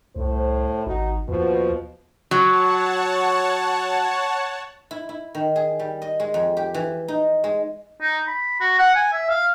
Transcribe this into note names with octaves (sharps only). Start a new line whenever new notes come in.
C2 A2 C5
G#1 D#4 F#4
D#2 B2 F3
F#3 C#5 F#5 A5
E4
E4
D#3
G#4
G3
D#5
G#3
F2
G4
E3
D#4
G#3
D#4
B5
F#4
F#5
G#5
E5
F5